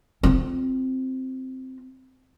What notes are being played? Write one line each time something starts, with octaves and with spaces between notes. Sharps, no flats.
C4 F4